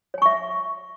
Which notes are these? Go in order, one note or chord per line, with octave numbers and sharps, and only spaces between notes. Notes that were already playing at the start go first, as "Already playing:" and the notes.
C#5 E5 G#5 C#6